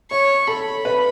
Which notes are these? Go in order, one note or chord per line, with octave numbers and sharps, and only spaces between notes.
C#5 C#6
A4 B5
B4